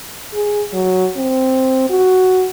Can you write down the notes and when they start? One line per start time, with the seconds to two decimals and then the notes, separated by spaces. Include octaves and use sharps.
0.34 G#4
0.73 F#3
1.16 C4
1.90 F#4